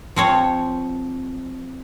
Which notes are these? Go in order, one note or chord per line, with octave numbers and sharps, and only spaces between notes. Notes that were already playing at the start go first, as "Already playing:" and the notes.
F3 C4 C#5